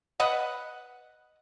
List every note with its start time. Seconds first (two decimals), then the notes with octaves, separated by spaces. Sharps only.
0.20 B4 D#5 F#5